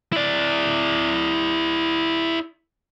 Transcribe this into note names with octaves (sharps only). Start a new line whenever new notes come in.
E4 D5